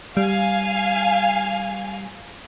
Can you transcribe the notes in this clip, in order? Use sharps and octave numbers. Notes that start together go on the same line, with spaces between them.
G3 F5 G#5